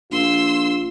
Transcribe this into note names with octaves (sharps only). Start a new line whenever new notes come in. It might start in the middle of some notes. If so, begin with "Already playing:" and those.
A#1 F4 C6 E6